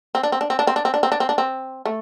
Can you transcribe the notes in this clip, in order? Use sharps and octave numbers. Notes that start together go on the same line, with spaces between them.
C4
D4
C4
D4
C4
D4
C4
D4
C4
D4
C4
D4
C4
D4
C4
A3